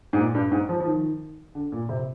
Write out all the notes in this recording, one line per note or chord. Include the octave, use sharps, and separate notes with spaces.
G#2
A#2
G2
G#2
F3
F3
D#3
D3
A#2
C3